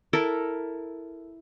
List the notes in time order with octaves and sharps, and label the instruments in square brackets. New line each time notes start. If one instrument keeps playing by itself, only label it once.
[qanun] E4 A4 A#4 E5